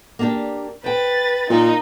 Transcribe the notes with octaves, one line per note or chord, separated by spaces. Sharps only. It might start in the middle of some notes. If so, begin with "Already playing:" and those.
A#3 D4 G4
B4 C5 G5 A6
A#2 D#4